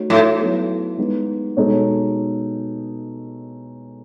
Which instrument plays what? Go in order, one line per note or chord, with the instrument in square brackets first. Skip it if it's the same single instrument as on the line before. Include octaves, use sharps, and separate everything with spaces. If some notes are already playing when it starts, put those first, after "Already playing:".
Already playing: [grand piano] A3 D#4 F#4 C#5
[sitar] A2
[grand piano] F#3 B3 E4 A4 C#5
G#3 B3 D#4
B2 G#3 D#4 A4 C#5